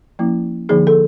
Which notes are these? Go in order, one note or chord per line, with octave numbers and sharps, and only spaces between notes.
F3 A#3 C#4 E4
D3 F3 A#3 D#4 G#4
A4